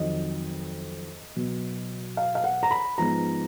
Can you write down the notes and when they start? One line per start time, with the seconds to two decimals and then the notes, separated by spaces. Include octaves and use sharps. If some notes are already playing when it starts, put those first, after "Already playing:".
Already playing: F2 D#3 F#3 D#5
1.36 B2 F#3 B3
2.17 F5
2.35 F5
2.44 F#5
2.63 A#5
2.71 B5
2.98 G#2 F3 B3 A#5